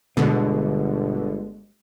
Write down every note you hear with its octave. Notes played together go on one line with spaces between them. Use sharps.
G1 B2 D3 G#3